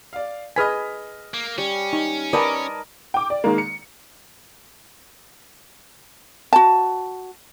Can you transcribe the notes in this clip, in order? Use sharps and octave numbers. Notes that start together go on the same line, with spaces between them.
D5 F5
G#4 B4 D#5 G#5 F6 B6
A#3
G3 C#4
D#4
A#4 B4 D5 D#5 G#5 A5 B5
G5 D6
D5
D#3 G#3 A#3
C#7
F#4 A5